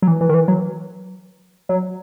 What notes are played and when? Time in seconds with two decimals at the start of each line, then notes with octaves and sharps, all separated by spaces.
0.02 F#3
0.08 E3
0.21 E3
0.29 D#3
0.34 E3
0.48 F#3
1.69 F#3